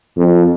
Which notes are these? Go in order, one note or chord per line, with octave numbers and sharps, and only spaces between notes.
F2